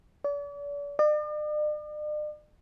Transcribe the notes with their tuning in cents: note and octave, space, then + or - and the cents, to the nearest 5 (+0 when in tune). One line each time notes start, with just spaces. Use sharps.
D5 -40
D5 +45